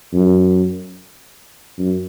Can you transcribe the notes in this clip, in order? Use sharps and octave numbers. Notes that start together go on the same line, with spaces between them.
F#2
F#2